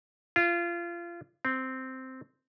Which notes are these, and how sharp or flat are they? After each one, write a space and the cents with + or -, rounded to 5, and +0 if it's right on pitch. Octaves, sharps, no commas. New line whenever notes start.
F4 -25
C4 -5